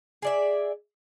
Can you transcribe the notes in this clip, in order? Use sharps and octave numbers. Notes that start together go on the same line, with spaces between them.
G#4 D5 E5